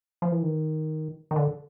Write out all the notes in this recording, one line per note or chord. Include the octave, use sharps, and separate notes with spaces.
F3
E3
D#3
D#3
D3